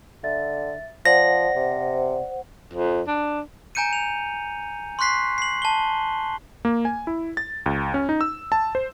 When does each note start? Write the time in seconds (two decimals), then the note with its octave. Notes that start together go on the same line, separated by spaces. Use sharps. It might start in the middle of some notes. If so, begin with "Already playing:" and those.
0.24 D3 E5 A6
1.05 F3 C5 D5 F#5 A#6
1.56 C3
2.73 F2
3.07 D4
3.75 G#5 A#5 G6 C#7 D#7
3.93 F7
4.99 C6 C#6 F#6 B6 C7
5.38 C7 F#7
5.62 A5 G7
6.65 A#3
6.85 G#5
7.07 E4
7.37 A6
7.66 C#2
7.94 C#4
8.09 D#4
8.21 E6
8.52 A5
8.75 C5